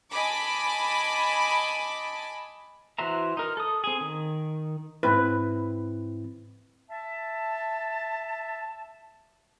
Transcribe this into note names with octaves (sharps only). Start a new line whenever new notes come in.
D#5 G#5 A5 B5 D6
E3 F#4 C5 E5 A#5
D#4 A#4
A4 D#6
C4 G#4
D#3
G#2 C4 E4 B4
E5 A5